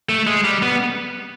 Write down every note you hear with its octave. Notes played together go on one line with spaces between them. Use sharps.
A3
G#3
G3
B3